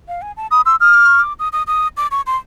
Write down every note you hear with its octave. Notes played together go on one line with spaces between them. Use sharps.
F5
G#5
A5
B5 D#6
C6 E6
D#6 F6
D6
C#6
D6
D#6
D#6
D#6
D6
C#6
C6